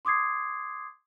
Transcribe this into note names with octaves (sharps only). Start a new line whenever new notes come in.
C6 D6 D#6 G#6 C7